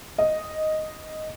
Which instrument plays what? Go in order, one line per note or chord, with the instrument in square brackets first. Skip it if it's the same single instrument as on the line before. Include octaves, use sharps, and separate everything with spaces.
[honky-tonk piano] D#5